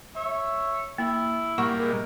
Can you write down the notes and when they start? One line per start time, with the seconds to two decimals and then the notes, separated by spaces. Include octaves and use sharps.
0.16 C#5 E5
0.98 A#3 E4
1.58 A#2 G3 A#3 F#5 C#6
1.79 G#3 A#4 B4 E5